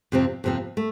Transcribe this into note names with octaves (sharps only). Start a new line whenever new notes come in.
F2 C3 F3 C4
F2 C3 F3 C4
A3